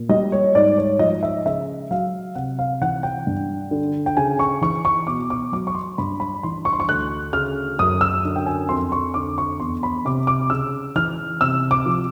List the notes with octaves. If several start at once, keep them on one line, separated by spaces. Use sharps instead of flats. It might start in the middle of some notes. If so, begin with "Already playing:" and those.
Already playing: A#2
G3 D#5
C#5
G#2 D5
C#5
F3 D#5
E5
C#3 E5
F#3 F5
C3 F#5
F5
E3 F#5
G5
G2
D3
G5
C#3 G#5
C#6
E3 C#6
C#6
B2 D6
D6
F#3 D6
C#6
C6
G2 B5
B5
E3 C6
C#6
C6
C#6
D2 F#6
C#3 F6
F#2 D#6
E6
D3
G5
G#5
F2 C6
C#6
D3 D6
C#6
E2 C6
B5
C3 D6
D6
C#3 E6
E3 F6
C3 E6
D6
F3